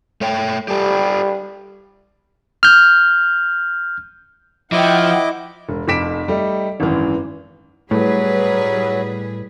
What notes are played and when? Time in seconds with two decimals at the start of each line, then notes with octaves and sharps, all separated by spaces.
0.21 A3 C#5 G5
0.68 G3 G4 A4
2.63 F6 G6
4.72 F3 E4 D#5 F#5 G5 D6
5.69 E1
5.88 F1 F2 D6 B6 D7 E7
6.28 G3 A3 D#4
6.80 G#1 F#2 E3
7.91 A2 F#3 G3 G#4 B4